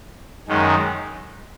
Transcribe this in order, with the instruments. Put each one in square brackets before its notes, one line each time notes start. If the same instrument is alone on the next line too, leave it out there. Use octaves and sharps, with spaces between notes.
[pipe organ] F#2 D#3 G#3